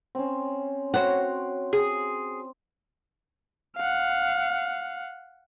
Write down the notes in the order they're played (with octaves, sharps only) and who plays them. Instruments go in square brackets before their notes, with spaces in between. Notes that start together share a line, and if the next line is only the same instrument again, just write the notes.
[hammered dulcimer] C4 C#4
[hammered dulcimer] C4 C6 [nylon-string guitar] F#4 C#5 F#5
[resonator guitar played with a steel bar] G#4
[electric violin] F5 F#5